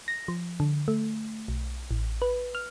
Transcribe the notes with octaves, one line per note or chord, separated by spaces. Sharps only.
A#6
F3
D3
A3
B1
A1
B4
F6